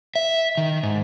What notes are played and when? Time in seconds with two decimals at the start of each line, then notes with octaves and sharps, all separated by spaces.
0.15 E5
0.57 D#3
0.83 G#2